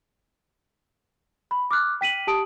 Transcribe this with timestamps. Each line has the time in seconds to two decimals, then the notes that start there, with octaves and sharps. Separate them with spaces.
1.51 B5
1.71 D6 F6 F#6
2.01 G5 B6 D#7 F#7
2.27 G4 A5 D#6 D7